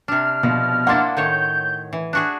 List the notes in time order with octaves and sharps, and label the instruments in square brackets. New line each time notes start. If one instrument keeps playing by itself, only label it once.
[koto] C3 D4 [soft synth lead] F6
[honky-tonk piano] B2 [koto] F3
[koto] A#3 D4 E4 [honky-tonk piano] F#5 C6 A6
[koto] A2 D#3 C#5 [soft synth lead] G6
[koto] E3
[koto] D4 F#4 G#4 [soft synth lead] F#6